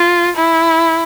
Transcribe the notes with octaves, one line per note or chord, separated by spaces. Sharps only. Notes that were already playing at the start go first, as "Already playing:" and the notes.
Already playing: F4
E4